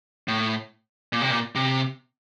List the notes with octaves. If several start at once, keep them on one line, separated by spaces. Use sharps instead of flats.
A2
A#2
C3
A#2
C3